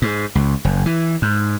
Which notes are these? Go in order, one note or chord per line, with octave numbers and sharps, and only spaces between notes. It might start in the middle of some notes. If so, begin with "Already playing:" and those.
G#2
C#2
F#1
E3
G#2